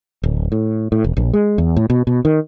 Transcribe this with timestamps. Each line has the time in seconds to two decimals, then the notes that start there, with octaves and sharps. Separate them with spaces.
0.23 D1
0.52 A2
0.92 A2
1.04 E1
1.17 A#1
1.33 G#3
1.58 E2
1.77 A2
1.90 B2
2.07 B2
2.25 D#3